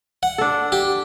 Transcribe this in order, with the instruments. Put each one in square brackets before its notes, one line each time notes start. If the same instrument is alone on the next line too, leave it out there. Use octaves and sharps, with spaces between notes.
[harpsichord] F#5
[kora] D4 A4
[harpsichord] G4